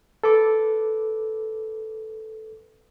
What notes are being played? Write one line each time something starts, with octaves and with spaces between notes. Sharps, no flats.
A4 B4 D6